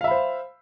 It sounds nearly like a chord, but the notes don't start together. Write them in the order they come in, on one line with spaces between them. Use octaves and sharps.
F5 E5 B5 C5